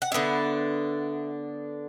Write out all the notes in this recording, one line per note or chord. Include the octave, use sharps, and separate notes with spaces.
F#5
D3 B3 D4 E5